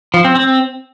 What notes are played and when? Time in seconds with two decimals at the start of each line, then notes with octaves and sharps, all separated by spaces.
0.14 F3
0.25 C4
0.35 C4